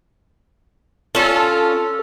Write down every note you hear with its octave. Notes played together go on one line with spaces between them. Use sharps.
C#4 F4 A4